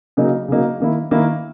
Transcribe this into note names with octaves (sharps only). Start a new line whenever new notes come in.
C#3 F#3 A#3 D#4
C#3 F#3 A#3 D#4
D#3 A#3 E4
D#3 A#3 E4